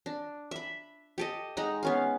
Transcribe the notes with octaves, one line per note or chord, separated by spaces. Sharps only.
D4
E5 B5
G4 A4 D#5
G#3 D#4 F#5 A#5
B3 C#4 F5